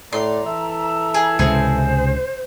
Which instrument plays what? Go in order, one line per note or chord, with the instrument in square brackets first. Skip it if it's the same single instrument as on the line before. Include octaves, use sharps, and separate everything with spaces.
[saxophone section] A2 D5 [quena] A#5 [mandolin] C6
[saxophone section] E3 A4 E5
[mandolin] G#4
[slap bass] C#2 G#2 C3 [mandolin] G#4 [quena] C5